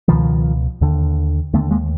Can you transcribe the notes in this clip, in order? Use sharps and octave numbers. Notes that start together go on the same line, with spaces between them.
C#2 B2 D#3 F3
D#2 D3
D#2 D3 A3 B3
G#3 A#3